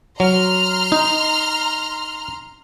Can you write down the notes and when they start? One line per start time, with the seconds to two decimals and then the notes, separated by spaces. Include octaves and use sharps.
0.20 F#3 A#5 C6 F6
0.92 D#4